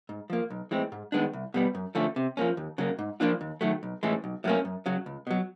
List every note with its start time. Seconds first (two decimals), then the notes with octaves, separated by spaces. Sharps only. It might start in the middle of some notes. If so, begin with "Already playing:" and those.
0.09 G#2
0.30 F3 A#3
0.50 B1
0.71 A2 E3 G#3 C4
0.92 G#2
1.12 D#3 G#3 B3 D4
1.33 C2
1.54 B2 G3 B3
1.75 F#2
1.95 D3 F3 A3 C#4
2.16 C3
2.37 F3 A#3 C#4
2.57 D#2
2.78 C#3 F#3 A#3
2.99 G#2
3.20 F3 A#3 D4 F4
3.41 D#2
3.61 D#3 F#3 A3
3.83 B1
4.03 A2 E3 G#3 C#4
4.24 B1
4.44 A2 F#3 A#3 C#4
4.65 F#2
4.86 C#3 F#3
5.06 C#2
5.27 B2 F#3